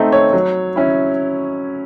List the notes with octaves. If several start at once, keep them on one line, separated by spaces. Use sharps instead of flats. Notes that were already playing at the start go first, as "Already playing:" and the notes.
Already playing: A3 C4 D#4
C#5
F#3
C#4 E4